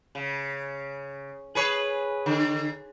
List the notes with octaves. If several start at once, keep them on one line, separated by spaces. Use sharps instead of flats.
C#3
G#4 B4 C#5
D3